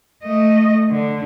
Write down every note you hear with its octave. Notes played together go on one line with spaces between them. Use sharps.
A3 D#5
D3